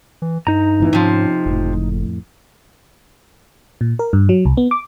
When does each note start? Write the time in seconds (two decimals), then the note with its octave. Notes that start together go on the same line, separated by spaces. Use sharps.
0.22 E3
0.47 G2 D#4 A#5
0.80 A1 E3 B3
0.93 G#2 C3 F3 C#4
1.46 F#1 F2 A2
3.81 A#2
3.99 A#4
4.13 G2
4.29 F#3
4.45 C2
4.57 B3
4.71 D6